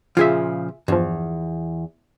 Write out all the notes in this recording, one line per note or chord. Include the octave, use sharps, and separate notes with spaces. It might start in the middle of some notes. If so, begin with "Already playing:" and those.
A#2 C#3 F3 F4 G#4 E5
E2 G2 F3